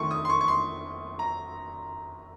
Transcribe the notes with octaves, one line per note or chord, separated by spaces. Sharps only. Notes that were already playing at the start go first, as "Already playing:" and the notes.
Already playing: F1 F2 D#3 A3 C6 C#6
D#6
C6
C#6
C#6
C6
A#5